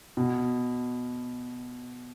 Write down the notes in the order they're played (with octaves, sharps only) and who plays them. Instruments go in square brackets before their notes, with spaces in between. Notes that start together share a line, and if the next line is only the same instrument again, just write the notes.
[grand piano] B2